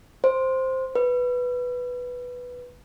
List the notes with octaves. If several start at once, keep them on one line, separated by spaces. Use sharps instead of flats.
C5
B4